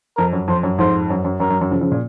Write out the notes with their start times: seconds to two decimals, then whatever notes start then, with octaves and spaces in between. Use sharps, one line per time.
0.17 F2 A#4
0.33 F#2
0.48 F2 C5
0.63 F#2
0.78 F2 G#2 C5
1.10 F#2
1.25 F#2
1.40 F#2 A#4
1.50 F#2
1.61 F#2
1.71 C#3 F3
1.81 C#3 F3
1.92 A#2